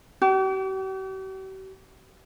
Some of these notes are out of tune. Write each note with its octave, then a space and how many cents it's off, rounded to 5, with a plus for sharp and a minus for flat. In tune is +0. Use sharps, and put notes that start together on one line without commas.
G4 -45